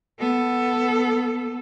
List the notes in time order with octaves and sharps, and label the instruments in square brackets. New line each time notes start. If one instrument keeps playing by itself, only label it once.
[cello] B3 A4